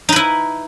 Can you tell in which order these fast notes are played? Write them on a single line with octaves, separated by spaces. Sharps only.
D#4 B4 E4